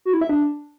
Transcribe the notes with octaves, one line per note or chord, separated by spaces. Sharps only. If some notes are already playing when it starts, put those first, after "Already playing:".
F#4
E4
E5
D4